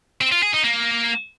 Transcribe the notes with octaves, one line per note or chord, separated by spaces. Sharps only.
C4
F4
G#4
D#4
A#3